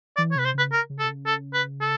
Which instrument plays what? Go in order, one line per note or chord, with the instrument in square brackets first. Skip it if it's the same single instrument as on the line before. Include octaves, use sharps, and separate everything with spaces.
[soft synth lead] E3 [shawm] D5
[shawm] C#5
[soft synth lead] C3 [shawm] B4
[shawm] C5
[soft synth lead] C#3 [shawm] B4
[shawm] A#4
[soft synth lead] C#3
[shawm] A4
[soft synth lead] C3
C#3
[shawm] A4
B4
A4